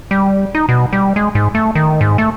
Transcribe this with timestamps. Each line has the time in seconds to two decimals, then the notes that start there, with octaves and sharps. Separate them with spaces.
0.11 G3
0.55 D#4
0.69 B2
0.93 G3
1.16 G#3
1.35 G#2
1.55 A3
1.75 D#3
2.01 G#2
2.18 A3